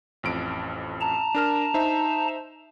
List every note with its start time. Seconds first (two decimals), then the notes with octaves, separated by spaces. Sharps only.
0.23 A1 F2 D7
1.01 A5 A#5
1.35 D4 A#4 F6
1.74 D#4 C5 E5